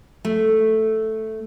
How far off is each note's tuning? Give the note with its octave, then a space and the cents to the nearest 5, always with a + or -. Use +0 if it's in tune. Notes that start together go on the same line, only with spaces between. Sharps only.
A3 +0